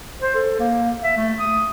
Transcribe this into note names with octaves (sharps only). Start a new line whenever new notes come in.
C5
A4
A#3
E5
A3
D#6